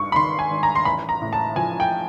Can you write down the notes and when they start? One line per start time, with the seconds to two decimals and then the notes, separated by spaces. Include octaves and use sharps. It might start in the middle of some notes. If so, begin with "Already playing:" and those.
Already playing: G#1 G2 C#6
0.12 B5
0.16 D#3 C6
0.39 G#5
0.51 G#1
0.63 A#5
0.75 C6
0.85 A1 B5
1.09 A#5
1.22 A2
1.33 A5
1.56 F3 G#5
1.80 G5